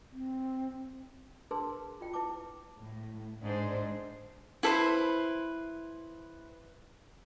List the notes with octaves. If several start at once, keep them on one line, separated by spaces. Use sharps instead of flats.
C4
D4 G#4 A#4 B4 A5 C6
F4 G5
E4 B4 A5 D6
A2
G#2 D4 C5
E4 A4 B4 C5